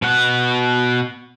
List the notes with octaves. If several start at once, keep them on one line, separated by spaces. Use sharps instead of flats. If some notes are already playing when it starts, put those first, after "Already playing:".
B2 F#5